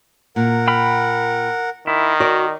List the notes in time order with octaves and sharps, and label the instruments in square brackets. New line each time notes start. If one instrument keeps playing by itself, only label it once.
[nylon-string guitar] A#2 [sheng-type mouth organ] A#4 F#5
[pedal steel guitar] G5 B5 F6
[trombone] D#3 [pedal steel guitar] E4
[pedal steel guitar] F#4 A#4 [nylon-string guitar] D5